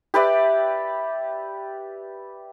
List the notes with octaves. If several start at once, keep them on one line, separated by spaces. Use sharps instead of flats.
G4 B4 D5 E5